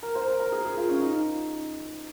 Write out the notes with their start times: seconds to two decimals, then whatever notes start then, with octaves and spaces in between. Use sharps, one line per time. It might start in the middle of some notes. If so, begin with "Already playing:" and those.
0.03 A#4
0.15 C5
0.27 A#4
0.40 A#4
0.52 G#4
0.65 G#4
0.77 F4
0.89 C#4
1.01 D#4